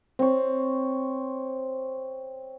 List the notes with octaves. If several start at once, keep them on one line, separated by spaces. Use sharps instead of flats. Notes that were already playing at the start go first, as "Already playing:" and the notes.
C4 C#5